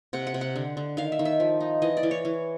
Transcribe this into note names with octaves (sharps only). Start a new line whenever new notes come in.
C3 F#5
F#5
C3
F#5
D3
D3
D#3 F5
E5
D#3
E5
F3
D#4
E3 D#5
D5
E3
C#5
E3